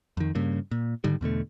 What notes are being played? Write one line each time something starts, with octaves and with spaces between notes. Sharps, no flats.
F2 D#3
G2 C#3 A#3
A#2
G#2 D3 D#3 G3
E2 B2 D3 A3